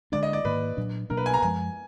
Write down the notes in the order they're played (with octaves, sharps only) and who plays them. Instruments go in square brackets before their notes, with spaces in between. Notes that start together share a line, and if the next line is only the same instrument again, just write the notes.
[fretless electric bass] D3 G#3 D4 [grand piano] D5
[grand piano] D#5
D5
[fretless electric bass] G#2 D#3 A#3 [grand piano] B4
[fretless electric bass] A#2 F#3 D4
[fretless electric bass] B2 F#3 A#3 D4 [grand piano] A#4
[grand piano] B4
G#5
A#5
[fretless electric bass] F#2 F3 G#3 [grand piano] G#5